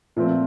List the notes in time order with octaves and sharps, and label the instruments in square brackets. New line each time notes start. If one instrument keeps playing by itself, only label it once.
[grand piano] A#2 F3 A3 C4